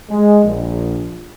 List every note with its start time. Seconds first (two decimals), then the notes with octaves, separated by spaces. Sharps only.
0.10 G#3
0.44 A#1